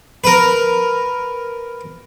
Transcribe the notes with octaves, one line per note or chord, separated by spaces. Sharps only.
A#4 B4